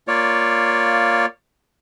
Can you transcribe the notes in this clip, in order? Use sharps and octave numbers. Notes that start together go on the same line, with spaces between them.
A#3 F4 C#5 D5